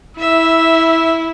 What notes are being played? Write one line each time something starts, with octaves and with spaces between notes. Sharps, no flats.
E4 E5